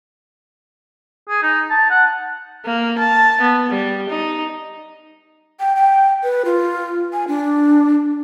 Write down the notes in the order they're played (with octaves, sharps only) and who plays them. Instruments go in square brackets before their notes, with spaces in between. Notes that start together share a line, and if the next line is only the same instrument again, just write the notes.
[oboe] G#4
D#4
A5
F#5
[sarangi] A#3
A5
B3
G3
D#4
[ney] G5
G5
B4
F4
G#5
D4